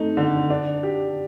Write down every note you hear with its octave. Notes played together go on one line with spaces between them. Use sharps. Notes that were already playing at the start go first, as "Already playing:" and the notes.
Already playing: A3 C4 D#4
D3
D4
G4